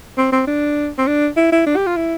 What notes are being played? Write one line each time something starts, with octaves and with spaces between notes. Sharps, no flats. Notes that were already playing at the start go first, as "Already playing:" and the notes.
C4
C4
D4
C4
D4
E4
E4
D4
G4
F4
E4